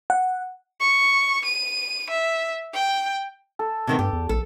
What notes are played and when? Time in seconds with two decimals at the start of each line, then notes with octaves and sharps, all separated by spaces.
0.10 F#5
0.80 C#6
1.45 D#7
2.10 E5
2.74 G5
3.59 A4
3.87 C3 D#3 B3
3.99 G2 G4
4.13 E2
4.29 A#1 A4